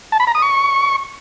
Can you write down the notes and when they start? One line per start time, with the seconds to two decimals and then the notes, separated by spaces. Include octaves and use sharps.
0.12 A5
0.20 B5
0.27 A#5
0.35 D#6
0.42 C#6